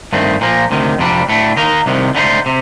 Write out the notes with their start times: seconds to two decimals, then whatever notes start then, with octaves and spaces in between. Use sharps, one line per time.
0.13 G2 D#3 A3 C4
0.41 A#2 F3 A#3
0.71 D2 C3 D#3
0.98 F2 C3 G3 D4
1.29 A2 A3 D4
1.57 D#3 A#3 D#4 A#4
1.86 C2 C3 D#3
2.15 D3 A3 D#4 G4 C5
2.46 C3